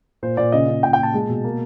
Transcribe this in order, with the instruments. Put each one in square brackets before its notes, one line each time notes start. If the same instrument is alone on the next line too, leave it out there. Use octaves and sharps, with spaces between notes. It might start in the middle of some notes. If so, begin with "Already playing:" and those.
[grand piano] A#2 C5
A#2 D5
C#3 D#5
C#3
A#2 G5
G5
A#2 A5
G#3
B2
A#3